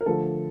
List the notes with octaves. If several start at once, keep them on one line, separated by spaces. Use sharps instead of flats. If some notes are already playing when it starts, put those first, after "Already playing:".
A#4
D3 F3 A3 A4